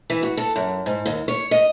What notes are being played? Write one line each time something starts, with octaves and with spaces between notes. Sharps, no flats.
E3
F#4
A4
F#2
G#2
D#2
C#5
D#5